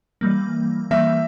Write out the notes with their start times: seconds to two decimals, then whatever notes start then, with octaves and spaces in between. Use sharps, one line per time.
0.21 E3 G3 A#3
0.91 E3 G3 A#3 E5